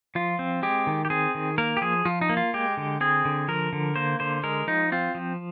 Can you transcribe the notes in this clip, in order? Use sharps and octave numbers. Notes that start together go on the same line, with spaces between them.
F3 F4
C4
G#3 G4
D#3
G4
C4 G#4
D#3
A#3 A#4
G4
F3 G#4
F3 F4
D#4
A#3
F4
G#3 G4
D3
C4 G#4
D3
F3 A#4
D3
A#3 C5
D3 C5
G#3 A#4
F3 D#4
C4 F4
F3